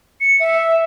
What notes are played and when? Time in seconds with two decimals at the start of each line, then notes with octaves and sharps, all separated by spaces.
0.21 C#7
0.40 E5